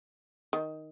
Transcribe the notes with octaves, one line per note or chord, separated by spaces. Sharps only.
D#3